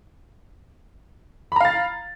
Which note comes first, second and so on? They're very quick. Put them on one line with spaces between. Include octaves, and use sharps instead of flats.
B5 A#5 F5 A6